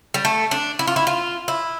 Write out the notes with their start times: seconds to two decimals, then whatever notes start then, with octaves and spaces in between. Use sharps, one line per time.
0.14 G3
0.25 A3
0.51 D4
0.79 E4
0.87 F4
0.96 E4
1.07 F4
1.48 E4